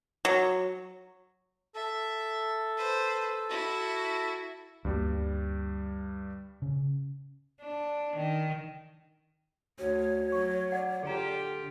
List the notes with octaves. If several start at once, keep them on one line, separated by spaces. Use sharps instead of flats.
F#3
A4 E5
B4 C5
E4 F#4
D2 G2 G3 A#3
C#3
D4
D#3
D2 F#4 C#5
F#3 C#6
D5 F#5
D3 F4 G4 G#4 A#5